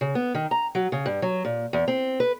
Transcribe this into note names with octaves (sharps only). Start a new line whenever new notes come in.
C#3
B3
D#3
A#5
F#3
C#3
G2
F#3
A#2
E2
C4
B4